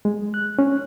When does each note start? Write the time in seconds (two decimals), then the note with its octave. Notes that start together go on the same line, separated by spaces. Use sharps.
0.05 G#3
0.34 F#6
0.59 C#4